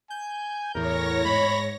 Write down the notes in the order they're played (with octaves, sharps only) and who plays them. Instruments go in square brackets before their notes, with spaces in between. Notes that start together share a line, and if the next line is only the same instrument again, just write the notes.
[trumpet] G#5 [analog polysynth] G6
[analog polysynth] E2 A2 E3 [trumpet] A#4 [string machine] C#5 A#6
[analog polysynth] G#2 [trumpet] B5